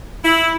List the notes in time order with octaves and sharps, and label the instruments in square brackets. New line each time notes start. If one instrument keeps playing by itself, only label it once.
[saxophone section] E4